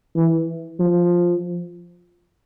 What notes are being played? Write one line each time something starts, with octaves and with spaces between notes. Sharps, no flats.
E3
F3